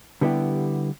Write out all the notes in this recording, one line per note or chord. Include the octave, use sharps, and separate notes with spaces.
D3 G3 B3 E4 G4